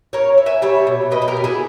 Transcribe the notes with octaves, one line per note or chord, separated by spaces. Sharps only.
C#4 A#4 C#5
E4
E5 G#5
G3 C#5 E5
B2
B2 B4 D#5
G#4
G4 A#4
B2
E4 G#4